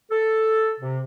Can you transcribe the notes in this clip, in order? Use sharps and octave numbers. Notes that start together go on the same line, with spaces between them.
A4
C3